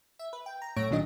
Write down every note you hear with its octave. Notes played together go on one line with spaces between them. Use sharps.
E5
B4
G5
A#5
F#2 A2 A3 C#5 A#6 D7
B1 A#2 D#3 F#3 D4 D#5